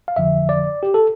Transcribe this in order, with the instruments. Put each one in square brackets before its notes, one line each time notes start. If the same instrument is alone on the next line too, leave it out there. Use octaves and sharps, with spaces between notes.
[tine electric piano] F5
G1 F2 D3 F3 E5
D5
G4
A4